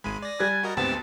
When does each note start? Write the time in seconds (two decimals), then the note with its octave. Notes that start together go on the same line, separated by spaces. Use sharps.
0.04 G#1 G#3 B5 D#7
0.23 D5 A#6
0.40 G3 G#5 F#6 A6
0.63 F#4 A#4 D#5
0.77 D2 G#2 B3 C4 G4 A5